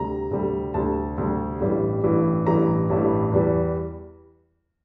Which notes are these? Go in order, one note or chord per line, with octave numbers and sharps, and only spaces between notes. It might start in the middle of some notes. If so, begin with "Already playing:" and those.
Already playing: D2 C3 G3 A#5
D2 C3 G3
D2 C3 G3 A5
D2 C3 G3
A1 G2 E3 G3
A1 G2 E3 G3
A1 G2 E3 G3 A#5
A1 G2 E3 G3
E2 E3 G3